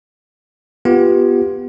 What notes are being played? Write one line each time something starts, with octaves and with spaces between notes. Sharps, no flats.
B3 F4 G4